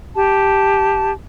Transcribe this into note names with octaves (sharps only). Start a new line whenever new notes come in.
G4 A5